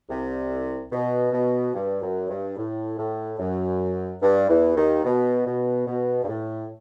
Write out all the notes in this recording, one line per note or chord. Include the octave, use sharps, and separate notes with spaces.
C2 C3
B2
B2
G2
F#2
G2
A2
A2
F#2
G2
E2 E3
D#2 D#3
B2
B2
B2
G2
A2